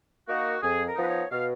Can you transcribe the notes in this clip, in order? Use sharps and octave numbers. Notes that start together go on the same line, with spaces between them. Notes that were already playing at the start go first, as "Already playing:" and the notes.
A#3 D#4 F#4
F2 G#4
A#4
F3 B3 D#4 B4
C#5
B2 F5